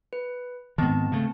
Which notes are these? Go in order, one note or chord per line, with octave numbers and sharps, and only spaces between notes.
B4
G#2 D#3 B3 C4 A5
C#3 A3